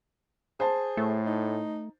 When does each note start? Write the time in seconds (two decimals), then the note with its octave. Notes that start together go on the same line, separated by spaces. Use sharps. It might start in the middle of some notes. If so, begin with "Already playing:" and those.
0.60 G#4 C5 A5
0.97 A2 A3
1.26 D#4